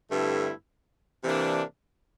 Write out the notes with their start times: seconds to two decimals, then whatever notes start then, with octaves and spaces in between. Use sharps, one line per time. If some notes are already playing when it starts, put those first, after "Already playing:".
0.11 G2 D3 A3 C4 E4
1.23 C3 E3 A#3 D4